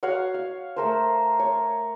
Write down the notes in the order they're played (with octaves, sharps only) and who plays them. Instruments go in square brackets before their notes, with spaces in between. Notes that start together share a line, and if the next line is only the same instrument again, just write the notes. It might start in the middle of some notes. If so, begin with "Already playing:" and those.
[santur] F#4 C#5 F5 F#5
F5
A3 A#4 C5
C#5